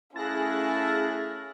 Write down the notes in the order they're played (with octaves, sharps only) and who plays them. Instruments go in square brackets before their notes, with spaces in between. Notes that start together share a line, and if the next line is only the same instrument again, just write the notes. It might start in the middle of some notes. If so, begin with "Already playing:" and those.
[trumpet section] A3 E4 F5 [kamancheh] C#4 [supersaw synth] G#4 F#6 A#6 [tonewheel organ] A5